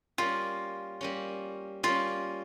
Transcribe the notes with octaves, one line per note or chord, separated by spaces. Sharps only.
G3 A#3 C#4 F4
G3 A#3 C#4
G3 A#3 C#4 F4